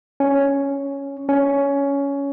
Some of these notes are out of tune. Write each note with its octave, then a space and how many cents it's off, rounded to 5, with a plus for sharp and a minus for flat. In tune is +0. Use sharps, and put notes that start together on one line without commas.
C#4 +5
C#4 +15